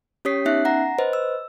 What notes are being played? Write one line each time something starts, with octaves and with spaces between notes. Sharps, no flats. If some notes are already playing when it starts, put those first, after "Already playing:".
C#4 G4 C#5 D#6 B6 C7
B3 C#4 D#4 E5 F#6 C7
F#5 A#5 A#6
B4 C5 D#5
E6